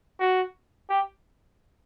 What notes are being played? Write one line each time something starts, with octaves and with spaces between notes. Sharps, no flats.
F#4
G4